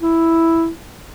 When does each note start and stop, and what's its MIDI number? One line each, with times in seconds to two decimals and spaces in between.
0.01 0.69 64